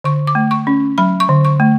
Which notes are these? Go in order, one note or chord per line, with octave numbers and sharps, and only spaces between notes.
D3 C#6
D6
A3
C#6
C#4
F#3 B5
C#6
D3
C#6
A3